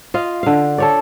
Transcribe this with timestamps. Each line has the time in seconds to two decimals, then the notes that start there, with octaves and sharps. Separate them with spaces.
0.14 F4 D#5 F5
0.43 D3 F5
0.78 A4 C#5 D5